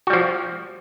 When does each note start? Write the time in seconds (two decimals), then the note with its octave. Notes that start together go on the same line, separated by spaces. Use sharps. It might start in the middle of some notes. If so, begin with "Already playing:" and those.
0.07 F#4
0.10 G3
0.13 F3